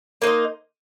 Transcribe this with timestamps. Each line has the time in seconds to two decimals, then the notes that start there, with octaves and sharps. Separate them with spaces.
0.22 A#3 D#4 C5 D#5